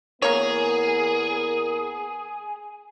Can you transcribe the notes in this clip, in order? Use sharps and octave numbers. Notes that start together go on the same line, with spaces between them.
E2 A#3 B3 G#4 A#4 C#5